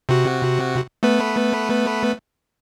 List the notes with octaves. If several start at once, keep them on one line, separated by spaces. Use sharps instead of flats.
C3 F#4
A3 B3 B4